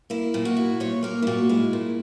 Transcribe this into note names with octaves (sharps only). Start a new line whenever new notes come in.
A#3 E4
A#2
F#4
E4
A#2 C#5
A#3 A#4
E4
A#2 F#4
G#3 E4
A#2